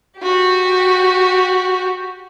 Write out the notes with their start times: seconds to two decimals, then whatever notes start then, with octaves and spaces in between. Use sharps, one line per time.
0.17 F#4 G4